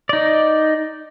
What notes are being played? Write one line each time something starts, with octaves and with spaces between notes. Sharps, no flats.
D#4 D5